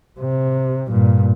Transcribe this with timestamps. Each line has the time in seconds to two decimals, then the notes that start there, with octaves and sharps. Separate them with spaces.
0.20 C3
0.88 G2 A#2